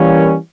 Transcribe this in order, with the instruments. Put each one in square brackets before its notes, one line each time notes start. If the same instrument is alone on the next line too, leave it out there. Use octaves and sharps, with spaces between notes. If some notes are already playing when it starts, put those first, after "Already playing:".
Already playing: [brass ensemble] E3 G3 A#3 C#4